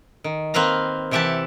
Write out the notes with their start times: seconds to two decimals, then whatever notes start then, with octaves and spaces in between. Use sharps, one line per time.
0.24 D#3
0.54 A#3 C4 B4 F5 A#5
1.11 C3 E3 G4 E5 F#5 A5